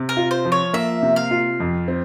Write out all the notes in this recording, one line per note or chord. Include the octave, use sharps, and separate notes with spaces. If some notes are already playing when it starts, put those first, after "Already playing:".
Already playing: C3
A#4
F4
C5
F3
C#5
A#3 E5
C3
F5
F4
F2
C4